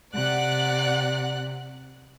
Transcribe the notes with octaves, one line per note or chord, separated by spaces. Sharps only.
C3 D5 F#5 F#6